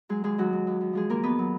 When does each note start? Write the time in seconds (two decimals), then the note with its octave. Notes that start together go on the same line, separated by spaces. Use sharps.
0.09 F#3 G#3 G#4
0.24 D#2 G#3 G#4
0.38 D#2 F#3 F#4
0.53 G#3
0.67 D#2
0.81 D#2
0.93 F3 G#3 G#4
1.10 D#2 A#3 A#4
1.23 D#2 B3 B4
1.39 F#3